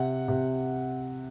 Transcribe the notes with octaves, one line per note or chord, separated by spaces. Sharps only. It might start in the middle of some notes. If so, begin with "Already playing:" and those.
Already playing: C3 F#5
C3